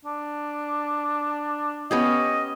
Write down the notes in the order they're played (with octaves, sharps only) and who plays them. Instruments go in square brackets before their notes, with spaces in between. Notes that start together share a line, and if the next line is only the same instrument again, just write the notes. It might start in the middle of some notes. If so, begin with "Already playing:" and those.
[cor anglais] D4
[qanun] B3 C#4 G4 [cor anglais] D#5